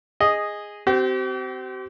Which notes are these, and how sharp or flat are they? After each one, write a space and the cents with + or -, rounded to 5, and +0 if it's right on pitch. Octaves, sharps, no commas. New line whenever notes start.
G#4 -10 D#5 +0
C4 -15 G4 -45